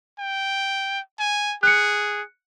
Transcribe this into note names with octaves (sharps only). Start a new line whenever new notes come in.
G5
G#5
G#4 F#6 C#7